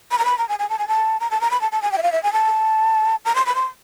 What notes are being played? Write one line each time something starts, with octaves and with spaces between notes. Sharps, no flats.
B5
A#5
B5
A#5
G#5
G#5
A5
G#5
A5
A#5
A5
A#5
B5
A5
A5
G#5
G5
E5
F5
E5
G#5
A5
A#5
C6
B5
C6